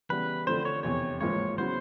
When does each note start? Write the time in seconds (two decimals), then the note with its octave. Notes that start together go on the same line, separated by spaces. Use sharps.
0.09 C#3 E3 G3 B3 B4
0.47 D3 F3 A3 C4 C5
0.65 C#5
0.83 F1 E2 C3 C#5
1.21 A1 G#2 F3 A#3 C#5
1.58 C#3 F#3 B3 E4 C5